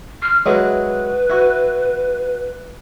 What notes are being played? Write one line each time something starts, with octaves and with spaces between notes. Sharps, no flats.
C6 F6
F#3 G#3 E4 B4
E4 F#4